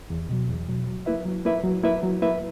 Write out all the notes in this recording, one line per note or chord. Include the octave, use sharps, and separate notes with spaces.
E2
B2 F#3
E2
B2 F#3
F#3
A#3 E4 B4 E5
F#3
A#3 E4 B4 E5
F#3
A#3 E4 B4 E5
F#3
A#3 E4 B4 E5